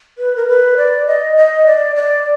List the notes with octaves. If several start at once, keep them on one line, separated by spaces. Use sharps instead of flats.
B4
A#4
B4
D5
D#5
D#5
D5
D5